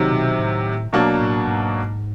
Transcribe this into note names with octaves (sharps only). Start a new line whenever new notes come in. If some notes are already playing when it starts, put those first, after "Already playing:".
Already playing: C3 D#3 F#3
B2
A2
B2 F#3 A#3 D4 F#4
A2
G#2